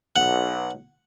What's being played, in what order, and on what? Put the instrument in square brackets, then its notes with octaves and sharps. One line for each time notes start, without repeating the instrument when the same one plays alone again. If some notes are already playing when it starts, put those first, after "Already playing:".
[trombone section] B1 [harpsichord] F#5